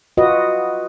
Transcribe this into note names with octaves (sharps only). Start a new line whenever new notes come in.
F4 F#4 B4 D#5